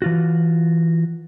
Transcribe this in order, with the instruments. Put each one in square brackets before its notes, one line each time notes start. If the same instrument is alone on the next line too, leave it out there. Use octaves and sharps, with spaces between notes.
[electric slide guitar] E3 F4 F#4